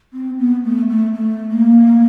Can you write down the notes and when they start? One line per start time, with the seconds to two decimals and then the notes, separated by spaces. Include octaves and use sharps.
0.13 C4
0.39 B3
0.64 A3
0.90 A3
1.14 A3
1.51 A#3